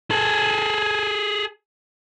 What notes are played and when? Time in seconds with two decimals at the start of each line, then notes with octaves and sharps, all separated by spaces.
0.11 G#4 A4